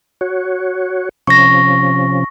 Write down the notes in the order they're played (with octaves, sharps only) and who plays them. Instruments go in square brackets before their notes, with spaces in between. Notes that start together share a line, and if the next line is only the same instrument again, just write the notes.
[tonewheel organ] F#4 C#5
[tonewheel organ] C3 F3 C#4 [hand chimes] C#6 A#6